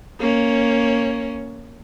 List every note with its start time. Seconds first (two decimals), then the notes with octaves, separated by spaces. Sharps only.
0.20 A#3 C#4